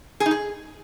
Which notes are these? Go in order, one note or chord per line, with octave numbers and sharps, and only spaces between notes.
G#4
D#4
G#4